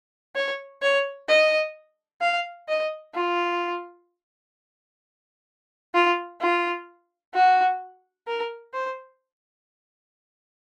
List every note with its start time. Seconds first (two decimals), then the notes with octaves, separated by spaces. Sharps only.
0.36 C#5
0.82 C#5
1.28 D#5
2.21 F5
2.68 D#5
3.14 F4
5.94 F4
6.41 F4
7.34 F#4
8.27 A#4
8.74 C5